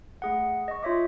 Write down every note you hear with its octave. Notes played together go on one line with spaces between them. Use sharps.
A3 G#4 F#5
D#5 C#6
F4 C#5 E5 D6